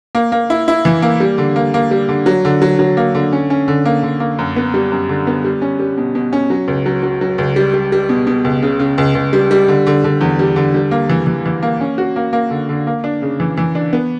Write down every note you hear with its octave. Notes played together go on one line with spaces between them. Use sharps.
A#3
A#3
E4
E4
E3
A#3
G3
D3
A#3
A#3
G3
D3
F#3
D3
F#3
F#3
A#3
D3
C#4
C#4
D3
A#3
D3
A#3
F#2
B3
G3
F#2
D3
B3
G3
C#4
G3
B2
B2
C#4
F#3
C#2
F#3
F#3
F#3
C#2
G3
G3
G3
B2
B2
C#2
C#3
C#3
C#2
C#2
G3
G3
D3
D3
D3
E2
G3
D3
G3
A#3
E3
E3
E3
A#3
C#4
F#4
A#3
A#3
D3
D3
A#3
D4
C#3
E3
E3
D4
B3